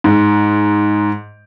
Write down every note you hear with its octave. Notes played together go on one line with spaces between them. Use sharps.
G#2